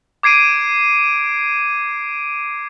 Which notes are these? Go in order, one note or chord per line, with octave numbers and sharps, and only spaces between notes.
D6 G#6 C7 D7 D#7